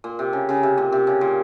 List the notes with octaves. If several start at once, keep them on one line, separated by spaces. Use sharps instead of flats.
A#2
C3
C#3
C#3
C3
A#2
C3
C#3
A#2